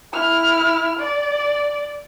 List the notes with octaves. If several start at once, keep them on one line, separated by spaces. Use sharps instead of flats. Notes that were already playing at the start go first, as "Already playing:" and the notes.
E4 F6
D5